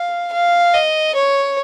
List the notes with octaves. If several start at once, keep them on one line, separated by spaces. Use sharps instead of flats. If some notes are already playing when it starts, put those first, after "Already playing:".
Already playing: F5
F5
D#5
C#5